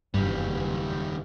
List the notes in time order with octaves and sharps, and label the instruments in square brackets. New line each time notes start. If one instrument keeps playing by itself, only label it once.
[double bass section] F#1 E2 [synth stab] G2 [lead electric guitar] D#3 G3